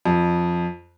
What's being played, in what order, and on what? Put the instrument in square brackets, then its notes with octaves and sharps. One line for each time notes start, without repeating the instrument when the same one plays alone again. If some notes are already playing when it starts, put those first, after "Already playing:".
[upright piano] F2